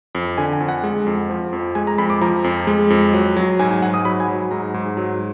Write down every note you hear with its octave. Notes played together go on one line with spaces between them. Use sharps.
F2
D3 G#5
G#5
F2
F#5
G#3
F2
F3
F2
G#3 G#5
A#5
F2 B5
D6
F3 A#5
F2
G#3
F2
F#3
F#3
G#2 G#5
G#5
G#2 F#5
D#6
F#3 B5
G#5
F#3
G#2 A#5
G#2
F#3